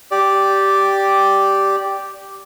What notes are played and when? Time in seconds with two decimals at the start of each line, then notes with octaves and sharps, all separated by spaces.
0.11 G4 D5